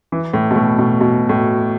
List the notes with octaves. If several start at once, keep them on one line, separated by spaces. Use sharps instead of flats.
E3
A2
B2
A2
B2
B2
A2